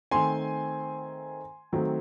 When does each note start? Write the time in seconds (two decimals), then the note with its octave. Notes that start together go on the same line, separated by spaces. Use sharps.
0.11 D#3 A3 C4 G#5 C6
1.73 D#3 F#3 A3 C4